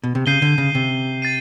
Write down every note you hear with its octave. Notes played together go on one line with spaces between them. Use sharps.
B2
C3
C#3 G6 C7 D#7 G7
D3
C#3
C3
A6 C7 D#7